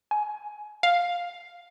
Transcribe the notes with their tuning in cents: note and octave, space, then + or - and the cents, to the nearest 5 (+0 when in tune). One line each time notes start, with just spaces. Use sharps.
G#5 +25
F5 +10